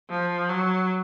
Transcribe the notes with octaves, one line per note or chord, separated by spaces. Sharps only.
F3
F#3